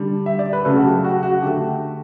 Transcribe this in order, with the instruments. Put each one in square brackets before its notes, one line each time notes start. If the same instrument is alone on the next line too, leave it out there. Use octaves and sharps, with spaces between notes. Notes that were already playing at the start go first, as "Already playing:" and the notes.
Already playing: [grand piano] D3 G3
E5
D5
B4
C#3 F#3 A3 A4
F#4
G4
F#4
F#4
D3 A3 G4